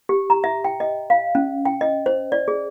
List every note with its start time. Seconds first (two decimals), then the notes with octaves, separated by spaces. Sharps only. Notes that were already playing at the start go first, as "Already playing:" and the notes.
0.09 G4
0.30 A#5
0.44 E5
0.65 G5
0.80 D#5
1.10 F5
1.35 C#4
1.65 G5
1.81 D#5
2.06 C5
2.32 D5
2.48 G#4